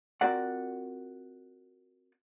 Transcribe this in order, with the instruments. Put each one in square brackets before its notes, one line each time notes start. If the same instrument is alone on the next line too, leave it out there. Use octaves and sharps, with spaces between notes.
[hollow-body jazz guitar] C4 F4 F#4 A#4 D5 F#5